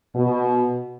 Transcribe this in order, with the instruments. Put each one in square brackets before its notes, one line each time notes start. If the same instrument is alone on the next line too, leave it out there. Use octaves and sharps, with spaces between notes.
[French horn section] B2